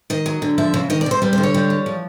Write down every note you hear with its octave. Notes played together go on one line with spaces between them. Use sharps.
D#3 D#5
F#3
D3
F3 E5
C#3
D#3 D#5
D5
C3 C5
G3 B4
C5
D3
C#5
G3
E3
F3